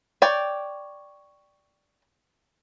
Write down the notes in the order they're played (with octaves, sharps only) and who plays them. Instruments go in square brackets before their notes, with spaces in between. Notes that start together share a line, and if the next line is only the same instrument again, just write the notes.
[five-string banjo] C#5 D5 G5